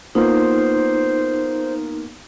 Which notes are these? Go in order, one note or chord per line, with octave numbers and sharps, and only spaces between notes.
A#3 B3 D#4 F4 C5